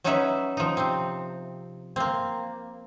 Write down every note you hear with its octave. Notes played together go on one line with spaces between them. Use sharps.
F#3 C#4 D#4 F#4 B4 E5
F3 D#4
C3 C4
A#3 C4